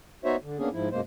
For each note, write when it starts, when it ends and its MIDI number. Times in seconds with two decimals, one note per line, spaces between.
0.25 0.36 59
0.25 0.36 63
0.25 0.36 66
0.25 0.36 72
0.25 0.36 73
0.25 0.36 76
0.42 0.58 50
0.58 0.69 58
0.58 0.69 59
0.58 0.69 61
0.58 0.69 62
0.58 0.69 68
0.73 0.89 44
0.73 0.89 53
0.73 0.89 64
0.92 1.01 42
0.92 1.01 47
0.92 1.01 56
0.92 1.01 58
0.92 1.01 72